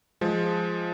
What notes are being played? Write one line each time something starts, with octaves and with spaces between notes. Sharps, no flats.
F3 G#3